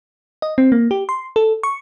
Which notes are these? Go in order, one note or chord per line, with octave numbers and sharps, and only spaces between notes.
D#5
C4
A#3
G4
C6
A4
C#6